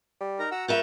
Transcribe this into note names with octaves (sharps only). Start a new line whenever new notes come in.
G3
D#4 A#4 A#5
F#4 F#5 A#5 E6
F4 A#4 B4 E5 C#6 G6